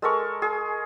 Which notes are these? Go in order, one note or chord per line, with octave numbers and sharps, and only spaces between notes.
G#3 A4 A#4 C#6
G#4